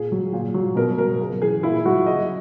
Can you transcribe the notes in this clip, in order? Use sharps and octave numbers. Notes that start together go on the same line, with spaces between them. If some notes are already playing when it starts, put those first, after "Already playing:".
Already playing: A#2 G#4
F#3
A#2
F#3
B2 A#4
F#3 A#4
C#3
E3 G#4
A#2 E4
F#3 F#4
C#3 D#5